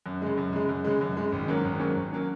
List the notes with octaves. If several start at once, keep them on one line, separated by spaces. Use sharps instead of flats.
F#2
C#3 G#3
F#2
C#3 G#3
F#2
C#3 G#3
F#2
C#3 G#3
G#1
G#2 F#3 A#3 C#4
G#1
G#2 F#3 A#3 C#4
G#1
F#3 A#3 C#4